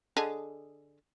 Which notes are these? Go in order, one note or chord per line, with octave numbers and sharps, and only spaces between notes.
D3 G#4 D#5